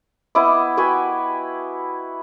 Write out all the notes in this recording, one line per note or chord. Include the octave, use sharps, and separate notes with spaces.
B3 E4 D#5 D6
F#4 B4 G5 G#5